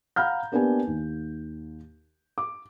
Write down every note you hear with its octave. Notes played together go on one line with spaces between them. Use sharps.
F5 F#5 A#5 B5 F6 G6
A#3 B3 D4 G4 B4 G#5
D#2
D6